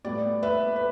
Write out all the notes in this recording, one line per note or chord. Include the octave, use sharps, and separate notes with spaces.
A2 G3 B3 D5
B4 E5
B4